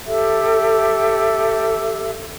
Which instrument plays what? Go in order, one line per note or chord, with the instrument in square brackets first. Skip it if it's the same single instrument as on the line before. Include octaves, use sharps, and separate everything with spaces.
[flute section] G4 A4 E5